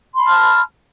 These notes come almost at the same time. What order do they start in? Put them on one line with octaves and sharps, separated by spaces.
C6 B5 A5 F6